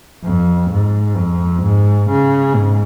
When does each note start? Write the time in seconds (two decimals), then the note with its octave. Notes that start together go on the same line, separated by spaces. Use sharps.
0.24 F2
0.70 G#2
1.16 F2
1.62 G#2
2.09 C#3
2.55 G#2